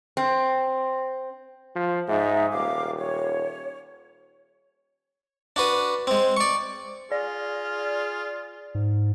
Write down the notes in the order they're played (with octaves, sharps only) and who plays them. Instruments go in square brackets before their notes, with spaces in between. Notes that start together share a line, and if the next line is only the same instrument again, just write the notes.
[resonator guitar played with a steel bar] C4
[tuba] F3
[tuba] G#2 [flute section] D#4 E5
[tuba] D#1 [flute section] F5 D6
[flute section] C#5
[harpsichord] D4 F#4 B4 D#6
G#3 C4
D5 C#6
[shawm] F4 [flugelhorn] G#4 [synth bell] D5
[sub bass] G#2